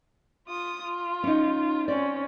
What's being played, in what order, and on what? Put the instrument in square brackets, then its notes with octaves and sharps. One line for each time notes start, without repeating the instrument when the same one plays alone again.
[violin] F4 D#6
F4
[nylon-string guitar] C#4 D#4
[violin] C4 C#4 [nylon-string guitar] D5